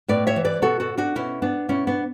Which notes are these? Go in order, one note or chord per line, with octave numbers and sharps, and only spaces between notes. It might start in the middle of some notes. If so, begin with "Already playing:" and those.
A2 B4 D5
C#5 E5
E3
B4 D5
B2 F#4 A4
F#4 A4
D4 F#4
B2 C#4 E4
B3 D4
B2 C#4 E4
B3 D4